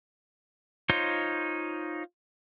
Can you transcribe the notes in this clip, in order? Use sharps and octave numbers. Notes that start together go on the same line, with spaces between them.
D#4 F4 C5 C#5 C6